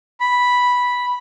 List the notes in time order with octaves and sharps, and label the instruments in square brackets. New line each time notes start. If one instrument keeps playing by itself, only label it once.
[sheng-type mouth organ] B5